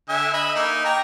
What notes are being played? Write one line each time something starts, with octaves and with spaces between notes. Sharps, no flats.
D3 E5 G#5
D#5 E5 B5
A#3 D#4
G5 G#5 A#5